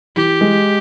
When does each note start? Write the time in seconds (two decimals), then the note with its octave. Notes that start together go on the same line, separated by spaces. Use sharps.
0.16 E3 G4
0.41 G#3